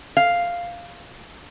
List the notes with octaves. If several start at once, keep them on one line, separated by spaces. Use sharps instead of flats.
F5